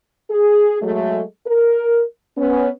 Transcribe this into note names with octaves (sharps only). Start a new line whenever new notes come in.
G#4
F#3 G#3 A3
A#4
B3 C#4